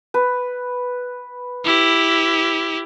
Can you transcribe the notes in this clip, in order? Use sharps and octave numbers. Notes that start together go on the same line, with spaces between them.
B4
E4 G4